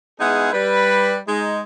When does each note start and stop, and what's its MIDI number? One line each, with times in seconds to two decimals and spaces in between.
0.20 0.51 56
0.20 0.51 59
0.20 0.51 63
0.20 0.51 64
0.20 0.51 68
0.20 0.51 78
0.53 1.18 55
0.53 1.18 71
1.28 1.62 56
1.28 1.62 63